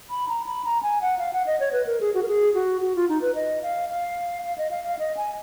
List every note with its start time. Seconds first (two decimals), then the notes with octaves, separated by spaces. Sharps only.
0.10 B5
0.29 A#5
0.46 B5
0.65 A#5
0.83 G#5
1.02 F#5
1.19 F5
1.33 F#5
1.47 D#5
1.60 C#5
1.73 B4
1.87 A#4
2.01 G#4
2.14 F#4
2.23 A#4
2.28 G#4
2.54 F#4
2.81 F#4
2.96 F4
3.09 D#4
3.22 B4
3.35 D#5
3.63 F5
3.90 F5
4.44 F5
4.58 D#5
4.71 F5
4.84 F5
4.99 D#5
5.17 G#5